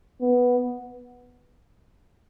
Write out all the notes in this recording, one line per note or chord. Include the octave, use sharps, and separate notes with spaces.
B3